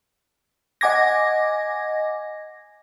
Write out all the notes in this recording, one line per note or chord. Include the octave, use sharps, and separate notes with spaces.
D#5 F#5 G#5 D6 G#6 A#6